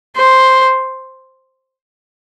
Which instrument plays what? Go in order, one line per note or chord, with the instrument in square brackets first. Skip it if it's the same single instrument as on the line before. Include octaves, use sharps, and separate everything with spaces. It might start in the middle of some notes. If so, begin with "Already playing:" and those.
[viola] C5